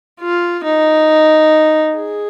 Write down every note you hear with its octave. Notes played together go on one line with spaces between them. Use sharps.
F4
D#4
G#4